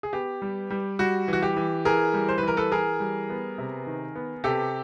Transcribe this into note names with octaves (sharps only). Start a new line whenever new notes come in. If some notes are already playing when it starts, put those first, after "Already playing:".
G#4
B3 G4
G3
G3
G3 F#4
E3 F#4
G4
E3
E3 G#4 A#4
G3
C5
B4
E3 A#4
A4 B4
E3 G#4 A#4
G3
B3
C3
D#3
B3
C3 G4 A4